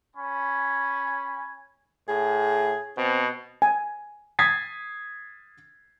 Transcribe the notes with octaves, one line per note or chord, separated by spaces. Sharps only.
C#4 G#5 B5
A2 G#4
B2 C4
G#5
D#6 G#6 A6 B6 C7